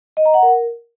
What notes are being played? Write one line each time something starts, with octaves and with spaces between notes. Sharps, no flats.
D#5
A#5
F#5
A#4